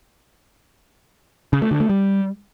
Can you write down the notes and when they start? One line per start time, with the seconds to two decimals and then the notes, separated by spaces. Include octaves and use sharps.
1.53 C#3
1.62 A3
1.71 D3
1.80 A3
1.89 G3